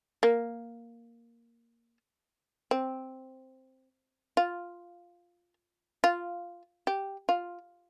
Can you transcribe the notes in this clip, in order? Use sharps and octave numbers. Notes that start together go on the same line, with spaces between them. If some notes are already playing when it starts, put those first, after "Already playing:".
A#3
C4
F4
F4
G4
F4